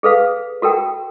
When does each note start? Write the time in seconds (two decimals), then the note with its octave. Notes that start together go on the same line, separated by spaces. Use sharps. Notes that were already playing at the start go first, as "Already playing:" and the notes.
0.03 G#4 A4 B4 F5
0.62 F#4 A4 A#4 G5